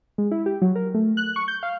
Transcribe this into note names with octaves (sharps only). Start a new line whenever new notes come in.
G#3
E4
G4
F#3
A#4
A3
F#6
C#6
G6
F5